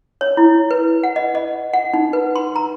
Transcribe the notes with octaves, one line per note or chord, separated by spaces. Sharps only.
C#5
E4
B4
F#5
D#5
D#5
F#5
D#4
B4
C6
A#5